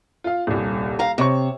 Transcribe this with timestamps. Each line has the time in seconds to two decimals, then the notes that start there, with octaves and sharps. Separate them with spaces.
0.24 F4 F5
0.47 D#1 C2
0.99 F5 A#5
1.18 C3 C5 C#5 C#6